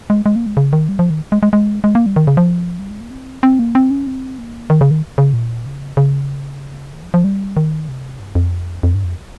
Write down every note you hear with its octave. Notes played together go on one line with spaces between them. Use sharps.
G#3
G#3
A#3
G#3
C#3
D#3
G3
F3
D#3
G#3
G#3
G#3
G#3
A#3
G3
D#3
C#3
F3
G3
G#3
A#3
C4
C4
A#3
C4
C#4
C4
A#3
D#3
C#3
D#3
C#3
A#2
C#3
C#3
D#3
F3
F3
G3
D#3
C3
G2
F2
F2
G2
F2